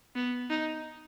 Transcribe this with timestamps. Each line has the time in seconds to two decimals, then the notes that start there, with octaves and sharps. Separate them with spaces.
0.16 B3
0.50 D#4